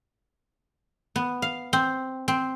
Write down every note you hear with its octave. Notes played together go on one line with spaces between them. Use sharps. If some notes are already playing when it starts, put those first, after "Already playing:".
B3
F5
C4
C4